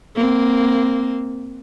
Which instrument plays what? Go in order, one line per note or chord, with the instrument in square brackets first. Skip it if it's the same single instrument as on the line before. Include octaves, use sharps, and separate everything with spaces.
[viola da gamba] A#3 C4